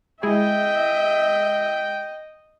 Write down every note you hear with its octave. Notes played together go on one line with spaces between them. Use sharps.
G#3 E4 G#4 D#5 E5 G5